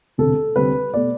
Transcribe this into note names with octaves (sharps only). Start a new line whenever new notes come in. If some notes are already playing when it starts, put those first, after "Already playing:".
E1 D2 C3 A4
D2 C3 G3 C4 B4
B2 A3 D5